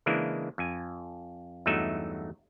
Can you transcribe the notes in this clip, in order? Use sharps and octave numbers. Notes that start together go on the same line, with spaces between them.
C#3 E3 G#3 A#3 D4 E4
F2 G#5
E2 G2 F#3 A3 D#4 E5